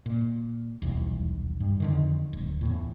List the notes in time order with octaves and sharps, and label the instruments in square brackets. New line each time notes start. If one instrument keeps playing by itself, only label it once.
[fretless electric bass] A#2
D#1 B1 E2
G2
F2 D3 D#3
D1
E2 A2